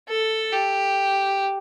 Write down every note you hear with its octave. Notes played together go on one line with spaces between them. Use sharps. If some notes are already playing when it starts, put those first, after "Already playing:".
A4
G4